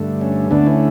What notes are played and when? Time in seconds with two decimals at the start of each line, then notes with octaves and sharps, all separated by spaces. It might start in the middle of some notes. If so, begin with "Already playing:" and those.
Already playing: G2 D3 A3
0.21 C#4
0.51 D2 D3 A3 B3 D4
0.66 C#4 E4